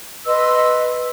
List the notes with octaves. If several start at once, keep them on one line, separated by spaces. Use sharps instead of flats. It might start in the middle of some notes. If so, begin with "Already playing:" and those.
B4 D#5 C6 E6